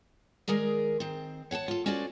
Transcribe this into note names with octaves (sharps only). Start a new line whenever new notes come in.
D#3 G#3 G#4 A#4 D5
D#3 C4
C#5 F#5 G5 A5
F4 A4
C#4 F#4 A4 C5 D5 G#5